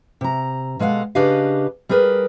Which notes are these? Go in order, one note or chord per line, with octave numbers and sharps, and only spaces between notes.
C3 A#5
B2 G#3 A4 F5 F#5
C#3 D4 G4 B4 D#5 F5
G3 G#4 A#4 B4